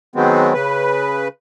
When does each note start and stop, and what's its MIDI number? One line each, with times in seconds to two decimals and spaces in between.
0.16 0.54 51
0.16 0.54 54
0.16 0.54 56
0.16 0.54 59
0.16 0.54 60
0.54 1.28 49
0.54 1.28 71